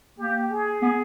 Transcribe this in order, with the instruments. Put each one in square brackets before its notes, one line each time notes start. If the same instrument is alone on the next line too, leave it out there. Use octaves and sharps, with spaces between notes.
[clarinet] A#3 [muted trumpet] G4
[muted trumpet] G#4
[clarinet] B3